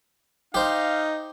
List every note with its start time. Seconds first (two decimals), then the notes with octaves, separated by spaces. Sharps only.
0.54 D#4 G4 C5 F5